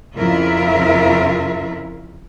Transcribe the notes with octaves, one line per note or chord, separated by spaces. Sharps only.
F2 C#3 E4 F4 A#4 E5